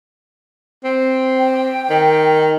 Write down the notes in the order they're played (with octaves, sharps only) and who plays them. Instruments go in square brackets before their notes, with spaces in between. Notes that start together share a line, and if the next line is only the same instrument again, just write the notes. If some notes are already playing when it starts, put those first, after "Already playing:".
[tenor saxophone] C4
[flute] G5
[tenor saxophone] D#3